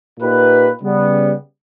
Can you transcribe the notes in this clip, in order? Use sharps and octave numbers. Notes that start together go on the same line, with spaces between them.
A#2 A#3 D#4 G4 B4
C#3 G3 B3